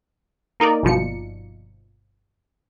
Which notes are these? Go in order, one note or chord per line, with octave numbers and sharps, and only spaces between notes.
A#3 D#4 A#4 D5
G1 B2 F3 C#7